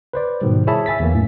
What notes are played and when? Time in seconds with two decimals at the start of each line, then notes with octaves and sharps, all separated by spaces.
0.13 B4 C5 D5
0.41 G#2 B2 D#3 G3
0.67 E4 G#4 C#5 E5 A5 B5
0.86 E5 G#5 A6 B6
1.00 E2 E3 A#3
1.14 F#2 A2